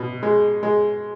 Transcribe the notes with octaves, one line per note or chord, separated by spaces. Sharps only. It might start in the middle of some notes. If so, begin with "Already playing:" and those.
Already playing: B2
G#3
G#3